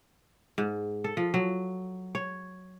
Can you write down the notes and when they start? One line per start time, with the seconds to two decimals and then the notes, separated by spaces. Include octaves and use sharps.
0.58 G#2
1.04 A4
1.17 F3
1.34 F#3
2.15 C#5